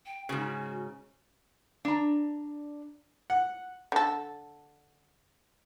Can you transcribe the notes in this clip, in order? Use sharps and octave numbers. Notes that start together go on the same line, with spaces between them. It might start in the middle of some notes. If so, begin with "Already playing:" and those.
G5
G#2 C#3 F#4
D4 A#5
F#5
D3 A4